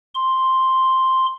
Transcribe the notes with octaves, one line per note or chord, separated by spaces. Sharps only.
C6